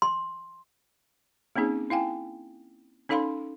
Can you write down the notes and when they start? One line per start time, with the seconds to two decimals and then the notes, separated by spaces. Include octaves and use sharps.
0.02 C6
1.56 A#3 C4 C#4 D#4 G#4
1.90 E4 F5 G5 G#5
3.09 C#4 D#4 A4 F5 B5 C6